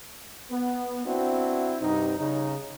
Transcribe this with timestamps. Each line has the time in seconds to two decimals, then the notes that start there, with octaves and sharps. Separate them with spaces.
0.51 B3
1.05 C4 D4 E4 F#4
1.81 G2 C3 D#4
2.18 C#3 D#4